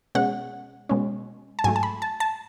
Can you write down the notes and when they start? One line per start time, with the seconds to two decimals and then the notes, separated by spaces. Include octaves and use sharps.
0.15 B2 G#3 C#4 F#5
0.89 B2 G#3 C#4
1.59 A5
1.64 G#2 F#3 A3 G#5
1.76 A5
1.83 B5
2.02 A5
2.20 A5